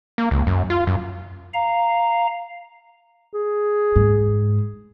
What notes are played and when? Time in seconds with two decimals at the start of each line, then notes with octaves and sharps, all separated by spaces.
0.18 A#3
0.31 C#2
0.47 F#2
0.70 F4
0.87 F#2
1.53 F5 A#5
3.34 G#4
3.96 G#2